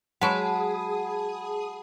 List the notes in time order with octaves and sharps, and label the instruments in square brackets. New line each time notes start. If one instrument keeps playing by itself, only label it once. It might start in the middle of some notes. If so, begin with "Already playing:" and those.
[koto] F#3 G#3 [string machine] G#4 D#6 [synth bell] F#5 A5 B5